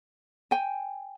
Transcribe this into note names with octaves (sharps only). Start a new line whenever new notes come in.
G5 G#5